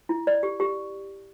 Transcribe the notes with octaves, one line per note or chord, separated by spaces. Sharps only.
E4
D5
G4
G4